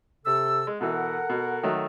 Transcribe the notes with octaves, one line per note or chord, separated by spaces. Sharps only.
C3 A4 E6
G#3
B2 E3 A4 A#4 F#5
B2
D#3 F#3 A3